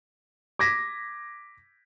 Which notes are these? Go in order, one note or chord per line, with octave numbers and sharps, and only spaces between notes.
D6 G#6 A#6 B6